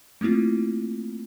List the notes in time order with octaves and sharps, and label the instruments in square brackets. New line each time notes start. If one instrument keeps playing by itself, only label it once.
[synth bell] A3 A#3 C4 E4 F4